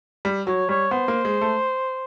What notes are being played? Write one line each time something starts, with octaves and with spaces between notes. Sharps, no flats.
G3
F#3 C#5
G3 C#5
B3 C5
A#3
G#3
A3